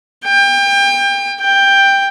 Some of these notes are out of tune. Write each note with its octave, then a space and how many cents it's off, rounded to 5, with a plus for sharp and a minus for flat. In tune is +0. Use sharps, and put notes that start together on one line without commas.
G5 +30
G5 +10